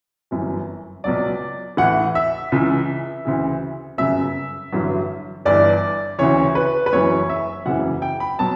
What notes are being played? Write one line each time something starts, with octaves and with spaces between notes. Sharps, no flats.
G1 F#2 E3
C#2 B2 F#3 D5
A1 A2 E3 F#5
E5
C#2 C#3 E3
D2 C#3 E3
G1 F#2 C#3 E5
A1 G2 D3 F#3
G1 G2 E3 D5
D2 C#3 E3 C#5
B4
B4
F#1 F#2 E3 C#5
E5
F#1 E2 C#3 E3 F#5
G5
B5
B2 F#3 A5